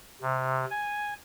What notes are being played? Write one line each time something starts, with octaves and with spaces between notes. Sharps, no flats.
C3
G#5